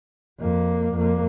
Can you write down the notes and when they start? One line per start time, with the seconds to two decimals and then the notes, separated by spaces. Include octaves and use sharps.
0.39 F2 A#3
0.94 F2 A#3